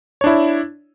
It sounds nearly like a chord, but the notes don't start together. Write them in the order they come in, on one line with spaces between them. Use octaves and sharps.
C#5 D4 E4